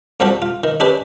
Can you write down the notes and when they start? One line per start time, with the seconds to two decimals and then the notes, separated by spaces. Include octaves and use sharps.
0.20 F2 F3 G3 F#4 G4 A4
0.42 F4
0.63 D#3
0.80 C#4 D4 G4 B4 D5